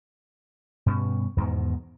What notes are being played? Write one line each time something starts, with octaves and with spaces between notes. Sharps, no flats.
G2 B2 C4 C#4
E2 G#2 B2 D#3